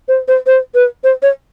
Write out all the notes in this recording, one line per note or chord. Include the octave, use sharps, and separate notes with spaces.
C5
C5
C5
B4
C5
C#5